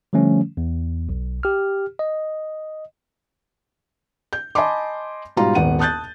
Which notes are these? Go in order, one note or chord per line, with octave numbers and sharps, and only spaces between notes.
D3 F3 G3 A3 C#4
E2
B1
G4 F6
D#5
G6
D#5 G#5 A5 B5 C6 D6
G#2 B2 G3 D#4 F4 A#5
D#1 G#1 B3 F#5 D#7
A5 D#6 F#6 G6 A6